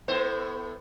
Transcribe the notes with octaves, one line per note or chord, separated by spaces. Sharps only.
A2 B3 C5